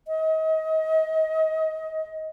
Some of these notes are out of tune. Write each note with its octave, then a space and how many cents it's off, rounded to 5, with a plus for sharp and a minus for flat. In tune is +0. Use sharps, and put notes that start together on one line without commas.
D#5 +30